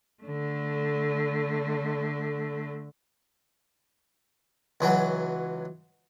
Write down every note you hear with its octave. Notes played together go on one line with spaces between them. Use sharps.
D3 A3
C#2 E3 F#3